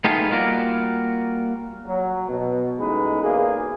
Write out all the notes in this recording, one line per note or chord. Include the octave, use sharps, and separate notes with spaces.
A3 B3 D#4 F4 G4 G#4
G3 A#3 F4 F#4 D5
F#3
B2
A1 B2 G#3 D#4 B4
B1 E2 A#3 G#4